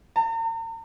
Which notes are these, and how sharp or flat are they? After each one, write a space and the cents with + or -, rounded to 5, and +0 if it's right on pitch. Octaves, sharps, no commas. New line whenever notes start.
A#5 -40